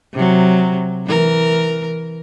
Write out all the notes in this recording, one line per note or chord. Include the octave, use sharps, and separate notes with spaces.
C3 F#3
E3 A#4